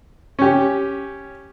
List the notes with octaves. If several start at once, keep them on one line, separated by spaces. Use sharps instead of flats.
C#4 G4